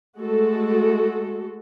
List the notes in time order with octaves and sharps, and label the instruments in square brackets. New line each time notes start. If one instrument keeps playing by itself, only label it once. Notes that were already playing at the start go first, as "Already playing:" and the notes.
[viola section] G#3 A3 F#4 A4